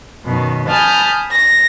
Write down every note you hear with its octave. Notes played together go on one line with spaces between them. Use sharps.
F#2 B2 D#3
G#5 A5 B5 D#6 F6 G6
A#6